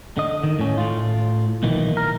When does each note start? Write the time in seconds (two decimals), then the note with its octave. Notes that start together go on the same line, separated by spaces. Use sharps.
0.17 D3 D#5
0.44 D#3
0.59 A2 C#4
0.78 A2 F4
1.63 B1 A#2 D#3 E3
1.97 A#4